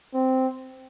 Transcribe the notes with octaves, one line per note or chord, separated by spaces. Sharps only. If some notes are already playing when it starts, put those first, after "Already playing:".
C4